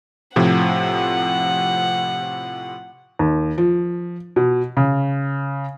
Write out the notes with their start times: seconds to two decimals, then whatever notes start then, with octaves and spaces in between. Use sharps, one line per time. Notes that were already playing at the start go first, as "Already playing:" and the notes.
0.36 A2 C3 F3 F#5
3.19 D#2
3.58 F3
4.36 B2
4.77 C#3